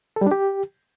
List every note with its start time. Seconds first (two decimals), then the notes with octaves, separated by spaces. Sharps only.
0.16 A4
0.21 G3
0.26 D4
0.31 G4